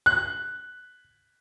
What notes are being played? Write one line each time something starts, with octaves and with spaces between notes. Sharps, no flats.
F#6